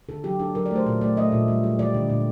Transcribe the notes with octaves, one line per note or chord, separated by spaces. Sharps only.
D3 A4
F#3 G4
D4 A4
F#3 A#4
D5
A3 C5
A#2 A4
A3 D5
A3 D#5
A#2
G3
G3
G3 D5
D3
A#2